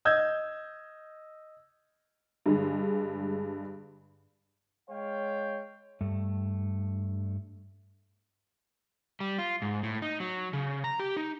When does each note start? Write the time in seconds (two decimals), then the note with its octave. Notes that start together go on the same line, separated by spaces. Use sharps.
0.05 D#5 E6 G6 G#6
2.46 G2 D3 G#3
4.89 G#3 C#5 F5 G5
6.01 G2 A3
9.20 G3
9.38 F4
9.62 G#2
9.83 A2
10.02 D#4
10.20 F#3
10.53 C#3
10.84 A#5
11.00 G4
11.17 D#4